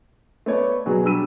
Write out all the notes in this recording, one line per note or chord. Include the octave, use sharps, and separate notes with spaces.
A3 B3 C#5 D5
B2 F#3 F#4 G#4
G3 D4 E6 D#7